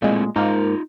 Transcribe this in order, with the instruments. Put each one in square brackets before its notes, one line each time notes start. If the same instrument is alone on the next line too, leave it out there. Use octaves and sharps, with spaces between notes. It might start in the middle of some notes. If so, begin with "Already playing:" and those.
[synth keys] A#2 G#3 [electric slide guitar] A3 C4 E4
[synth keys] G#2 A#3 [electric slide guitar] D#4 F4 A#5